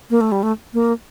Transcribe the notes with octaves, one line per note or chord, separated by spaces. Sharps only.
A#3
A3
G3
A3
A#3